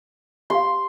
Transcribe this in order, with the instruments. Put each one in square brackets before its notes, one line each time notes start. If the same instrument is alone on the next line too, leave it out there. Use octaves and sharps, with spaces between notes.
[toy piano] G4 F5 [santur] C6